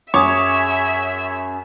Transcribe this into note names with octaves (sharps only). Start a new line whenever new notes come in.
F#2 G#4 C#5 E5 D6 D#6